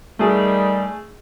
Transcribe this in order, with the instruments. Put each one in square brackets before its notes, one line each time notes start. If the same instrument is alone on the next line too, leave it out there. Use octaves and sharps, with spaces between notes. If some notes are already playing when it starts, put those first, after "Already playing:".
[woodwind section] D#3 G3 [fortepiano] A3 G#4